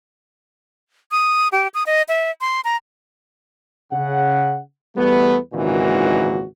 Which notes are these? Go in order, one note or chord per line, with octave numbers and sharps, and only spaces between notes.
D#6
G4
D#6
D#5
E5
C6
A#5
C#3 F#5
E2 G3 A3 B3
G#1 C#2 A#2 D#3 E3 F#4